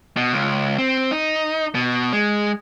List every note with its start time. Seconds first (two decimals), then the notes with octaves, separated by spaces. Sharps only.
0.17 B2
0.33 C#2
0.78 C4
1.11 D#4
1.75 B2
2.13 G#3